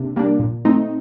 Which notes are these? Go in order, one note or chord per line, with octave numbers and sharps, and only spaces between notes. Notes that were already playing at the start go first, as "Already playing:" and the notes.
Already playing: C3 A#3 D4
G3 A#3 D4
A#2
A3 C4 D#4